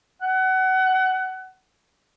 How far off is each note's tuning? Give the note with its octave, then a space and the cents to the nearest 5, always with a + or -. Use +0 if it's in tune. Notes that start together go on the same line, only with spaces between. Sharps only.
F#5 +25